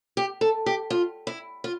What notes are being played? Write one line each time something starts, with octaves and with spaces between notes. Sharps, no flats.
G4
A4
G4
F4
E4
F4